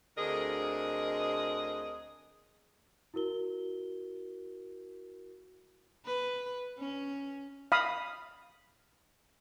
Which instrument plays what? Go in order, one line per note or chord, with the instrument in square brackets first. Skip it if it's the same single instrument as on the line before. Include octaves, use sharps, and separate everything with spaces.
[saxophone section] D2 D3 C4 G#4 A#4 D#5
[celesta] E4 F#4 A#4 G7
[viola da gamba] B4
C#4
[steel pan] F5 B5 D#6